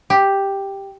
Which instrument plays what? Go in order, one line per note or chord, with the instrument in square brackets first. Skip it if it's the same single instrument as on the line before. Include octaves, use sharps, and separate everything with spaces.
[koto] G4